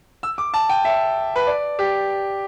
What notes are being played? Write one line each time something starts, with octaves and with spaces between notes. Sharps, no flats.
E6
D6
A5
G5
E5
B4
D5
G4